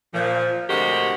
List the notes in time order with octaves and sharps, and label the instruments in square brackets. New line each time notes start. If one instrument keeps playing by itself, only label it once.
[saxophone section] A#2 F3
D2 C3 G#3 F#4 G4 A#4